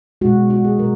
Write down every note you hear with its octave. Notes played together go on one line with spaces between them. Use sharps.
B2 G#3 F#4
F#4
G#4
B2 F#3 A#4